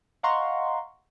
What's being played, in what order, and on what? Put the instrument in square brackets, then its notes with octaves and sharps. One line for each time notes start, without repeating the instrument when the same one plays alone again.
[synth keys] D#5 F5 F#5 A#5 C6 C#6